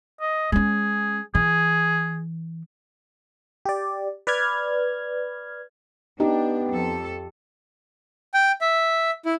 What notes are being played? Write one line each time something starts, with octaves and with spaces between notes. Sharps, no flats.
D#5
G#3 C#4 G#4
E3 G#4
G4 D5
B4 D5 F6 G#6
B3 D4 D#4 G4
F2 A4
G5
E5
E4